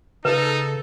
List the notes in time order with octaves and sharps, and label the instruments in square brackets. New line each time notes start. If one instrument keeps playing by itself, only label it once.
[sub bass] C#3 [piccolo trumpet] D#4 [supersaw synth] A4 [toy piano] B4